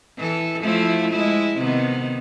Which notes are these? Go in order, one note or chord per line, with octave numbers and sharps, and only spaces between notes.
E3 A4
F3 A3 E4
G#3 E4
C3 D#3 B3